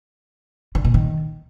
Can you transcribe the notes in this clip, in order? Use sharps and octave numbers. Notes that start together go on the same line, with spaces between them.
D3
A#2
D#3